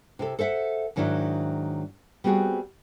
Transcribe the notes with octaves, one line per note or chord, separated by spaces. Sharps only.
C3 E4 A4
A4 C5 E5 F#5
G#2 D#3 F#3 D4 E4
G3 B3 C4 F#4 G#4